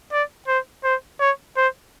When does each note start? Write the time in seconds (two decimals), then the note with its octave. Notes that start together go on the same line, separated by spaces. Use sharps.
0.12 D5
0.48 C5
0.84 C5
1.20 C#5
1.57 C5